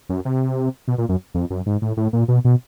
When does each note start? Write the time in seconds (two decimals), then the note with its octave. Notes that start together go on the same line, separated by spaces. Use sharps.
0.09 F#2
0.25 C3
0.88 B2
0.98 A#2
1.09 F#2
1.34 F2
1.50 F#2
1.66 G#2
1.82 A2
1.97 A2
2.13 A#2
2.28 B2
2.45 B2